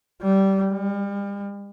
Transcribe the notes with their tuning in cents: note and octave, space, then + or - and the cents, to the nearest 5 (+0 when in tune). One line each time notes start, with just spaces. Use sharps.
G3 -20
G3 +40